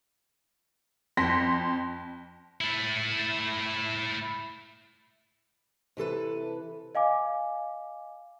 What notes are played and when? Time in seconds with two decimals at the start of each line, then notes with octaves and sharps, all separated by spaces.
1.17 F2 C6 A#6 B6
2.61 A3 E4
5.97 C3 E3 A4 B4
6.95 D#5 F5 G#5 D6